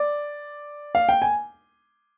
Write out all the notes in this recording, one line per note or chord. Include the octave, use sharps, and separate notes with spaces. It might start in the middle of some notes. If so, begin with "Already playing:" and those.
Already playing: D5
F5
G5
G#5